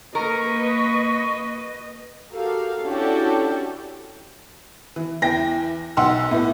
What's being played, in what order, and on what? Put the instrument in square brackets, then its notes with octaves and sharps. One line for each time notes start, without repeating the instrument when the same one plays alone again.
[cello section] A#3 B4 [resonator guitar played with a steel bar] A#4 [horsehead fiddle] D#5 [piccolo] C#6
[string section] F#4 G4 A4 A#4 F5
C#4 D4 E4 F#4 G4 A4
[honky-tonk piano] E3
E2 E3 G5 A#6
B1 F#5 C6 E6
A2 B3